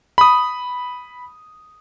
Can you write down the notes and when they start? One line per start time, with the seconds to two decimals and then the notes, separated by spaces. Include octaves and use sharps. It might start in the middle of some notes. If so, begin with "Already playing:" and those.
0.18 B5 D#6